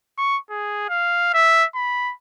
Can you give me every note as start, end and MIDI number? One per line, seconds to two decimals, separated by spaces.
0.18 0.38 85
0.50 0.86 68
0.89 1.33 77
1.34 1.65 76
1.75 2.13 83